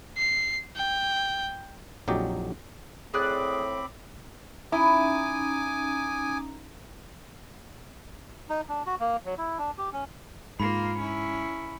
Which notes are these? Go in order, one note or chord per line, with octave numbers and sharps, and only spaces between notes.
C7
G5
A#1 F2 F#3 D#4 G4 D5
A2 C4 G#4 D5 B5 D6 F#6
C#4 D#4 E4 G#5 A#5 D6 D#6
D#4
D4
F#4
A#3
F#3
E4
D4
G4
C#4
G#2 A#3 F4 A#5 B5
C#4 E4